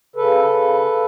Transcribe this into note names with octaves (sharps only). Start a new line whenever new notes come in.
C#3 A4 B4
C#3